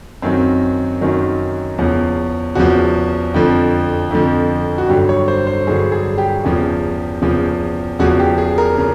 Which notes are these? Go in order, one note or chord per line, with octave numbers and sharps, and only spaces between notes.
F#2 D#3 F#3 C4
F#2 D#3 F#3
E2 C#3 F3 C#4
E2 C#3 F3 F#4
F2 D3 F3
F2 D3 F3
F#4
G2 D3 F#3 G4
C#5
C5
C5
G2 D3 F#3 G#4
G#4
G4
E2 C#3 F3
E2 C#3 F3
E2 C#3 F3 F#4
G4
G#4
A#4
C#3